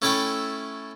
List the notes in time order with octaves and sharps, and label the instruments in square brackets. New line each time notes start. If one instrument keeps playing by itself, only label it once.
[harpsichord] A3 C#4 E4 A4 E5 G5